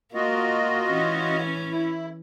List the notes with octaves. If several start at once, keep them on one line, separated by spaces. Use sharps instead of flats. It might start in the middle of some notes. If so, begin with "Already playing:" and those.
A#3 F4 F#4 D#5
E3 C#4
E4